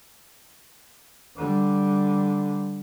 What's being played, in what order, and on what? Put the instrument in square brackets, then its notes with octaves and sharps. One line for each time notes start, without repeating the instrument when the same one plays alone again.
[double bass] D3 G3